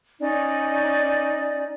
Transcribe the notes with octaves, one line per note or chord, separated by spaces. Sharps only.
C#4 D#4 D5